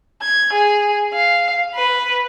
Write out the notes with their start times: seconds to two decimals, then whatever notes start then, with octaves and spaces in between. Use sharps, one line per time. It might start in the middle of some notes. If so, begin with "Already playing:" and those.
0.23 G#6
0.54 G#4
1.14 F5
1.75 B4